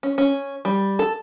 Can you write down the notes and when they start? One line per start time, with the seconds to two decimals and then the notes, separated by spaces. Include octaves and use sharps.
0.03 C#4
0.18 C#4
0.65 G3
0.99 A4